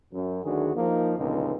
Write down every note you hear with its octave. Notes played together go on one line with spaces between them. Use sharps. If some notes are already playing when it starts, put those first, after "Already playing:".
F#2
D2 D#3 D4 F#4 G#4
F3 A#3 D#4
C#2 F#2 B2 D3 C4 D#4